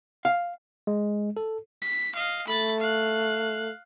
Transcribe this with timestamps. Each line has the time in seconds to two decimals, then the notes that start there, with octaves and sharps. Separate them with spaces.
0.25 F5
0.87 G#3
1.37 A4
1.82 B6
2.15 D#5 F5
2.48 A3 B5 A6
2.80 F5 F#6